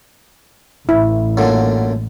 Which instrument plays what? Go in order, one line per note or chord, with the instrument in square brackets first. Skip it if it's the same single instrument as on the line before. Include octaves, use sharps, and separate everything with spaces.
[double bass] A1 [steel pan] E4
[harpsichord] F#2 A#2 D3